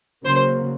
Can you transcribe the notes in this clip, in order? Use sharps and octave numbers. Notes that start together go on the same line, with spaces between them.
C#3 F#3 A#3 C5